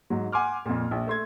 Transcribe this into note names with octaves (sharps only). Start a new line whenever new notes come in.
G#2 F#3
F#5 G#5 C6 D6 F6
F2 A#2
A#1
A3 C6 G#6